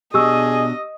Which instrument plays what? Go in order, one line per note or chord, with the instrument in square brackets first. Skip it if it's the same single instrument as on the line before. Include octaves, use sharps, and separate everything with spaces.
[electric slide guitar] B2 D4 [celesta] G4 C#6 E6 [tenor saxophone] G#4 [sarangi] D#5